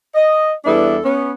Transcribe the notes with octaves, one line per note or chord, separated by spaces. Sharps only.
D#5
E2 G3 B3 D4 E4 A4
B3 C#4